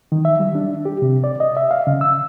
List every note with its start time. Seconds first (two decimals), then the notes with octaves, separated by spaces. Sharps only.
0.12 D#3
0.25 E5
0.40 G3
0.55 D4
0.85 G4
1.02 C3
1.24 D5
1.40 D#5
1.57 E5
1.71 F5
1.87 C#3
2.01 E6